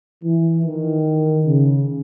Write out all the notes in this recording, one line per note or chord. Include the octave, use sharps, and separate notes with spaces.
E3
D#3
C#3